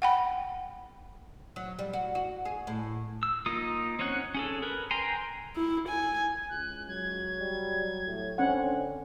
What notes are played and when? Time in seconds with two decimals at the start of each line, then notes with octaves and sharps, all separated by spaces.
0.02 F#5 G5 B5
1.56 F#3
1.79 G3
1.93 F#4
2.15 F#4
2.45 G#4
2.67 A2
3.23 E6
3.46 A#3 D#4 F4 D#6
3.99 C4 C#4 D#4 C#5 F#5
4.35 C#4 G#4 A4
4.63 A#4 B4
4.91 G5 G#5 A#5 C6
5.56 E4
5.89 G#5
6.50 C#2 F#6
6.89 F#3 G#6
7.39 G3
8.05 A2
8.38 D3 C4 C#4 F#5